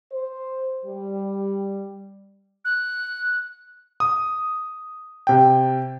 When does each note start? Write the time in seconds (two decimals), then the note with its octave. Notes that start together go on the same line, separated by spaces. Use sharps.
0.12 C5
0.85 G3
2.65 F#6
4.00 D#6
5.27 C3 G5